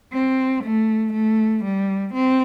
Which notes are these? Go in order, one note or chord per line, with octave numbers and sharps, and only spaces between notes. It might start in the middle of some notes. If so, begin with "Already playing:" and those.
C4
A3
A3
G3
C4